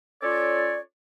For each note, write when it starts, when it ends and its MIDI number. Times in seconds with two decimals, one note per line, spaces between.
0.22 0.78 61
0.22 0.78 65
0.22 0.78 69
0.22 0.78 73
0.22 0.78 74